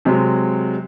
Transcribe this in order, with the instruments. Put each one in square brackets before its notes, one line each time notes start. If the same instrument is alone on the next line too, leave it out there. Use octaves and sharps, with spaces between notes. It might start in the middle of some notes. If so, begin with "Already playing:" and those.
[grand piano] C3 F#3 G#3